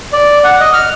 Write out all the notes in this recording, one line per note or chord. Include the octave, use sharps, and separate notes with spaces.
D5
F#5
D#5
F6